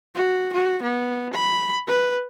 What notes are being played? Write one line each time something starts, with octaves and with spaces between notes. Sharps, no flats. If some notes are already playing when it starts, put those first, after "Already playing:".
F#4
F#4
B3
B5
B4